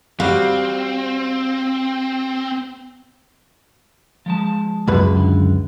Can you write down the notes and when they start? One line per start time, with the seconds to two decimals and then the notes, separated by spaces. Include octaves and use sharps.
0.20 G3 C4 F#4 F5
4.26 F3 G#3 A5
4.88 C#2 F#2 B4
5.17 D3